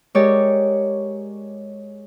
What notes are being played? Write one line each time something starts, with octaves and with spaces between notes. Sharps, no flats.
G#3 G4 A#4 C#5 D5